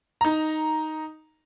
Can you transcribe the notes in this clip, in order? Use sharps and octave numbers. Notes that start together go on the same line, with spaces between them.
D#4 A#5